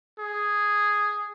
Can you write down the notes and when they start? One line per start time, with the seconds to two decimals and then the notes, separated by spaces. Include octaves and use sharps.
0.19 G#4